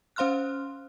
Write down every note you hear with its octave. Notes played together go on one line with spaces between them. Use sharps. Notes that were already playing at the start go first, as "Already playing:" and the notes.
C#4 C5 F5 C6 F6 F#6